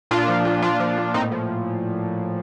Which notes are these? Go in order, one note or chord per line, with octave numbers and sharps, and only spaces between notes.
A#2 D4 F4
F3
A#2
A#2 D4 F4
F3
A#2
A2 C4 D#4
F3